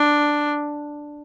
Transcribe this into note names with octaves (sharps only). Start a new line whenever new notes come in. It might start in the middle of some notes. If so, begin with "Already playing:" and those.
Already playing: D4